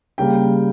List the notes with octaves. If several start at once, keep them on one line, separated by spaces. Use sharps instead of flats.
C#3 G3 A#3 G5